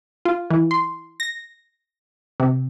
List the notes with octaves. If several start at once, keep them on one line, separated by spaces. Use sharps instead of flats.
F4
E3
C6
A#6
C3